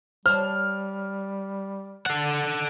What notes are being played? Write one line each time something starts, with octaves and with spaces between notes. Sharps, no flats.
G3 C5 C#5 A5 F6
D3 A4 F#5 A6 C7